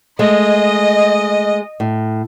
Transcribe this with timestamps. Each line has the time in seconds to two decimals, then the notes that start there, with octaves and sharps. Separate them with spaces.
0.19 G#3 A3 D#5
1.80 A2